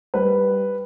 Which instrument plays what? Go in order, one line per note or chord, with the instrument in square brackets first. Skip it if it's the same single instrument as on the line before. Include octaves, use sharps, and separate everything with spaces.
[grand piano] G3 B4